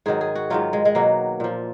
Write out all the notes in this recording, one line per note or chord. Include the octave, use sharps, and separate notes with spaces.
G#2 D#3 F#3 G#4
G#4
F#4
G#2 D#3 F#3 F4
G#3
G#3
B2 F#3 A#3
A#2 F3